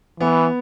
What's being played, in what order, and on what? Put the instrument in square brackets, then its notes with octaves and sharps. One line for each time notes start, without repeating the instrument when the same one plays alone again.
[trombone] E3 [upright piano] B3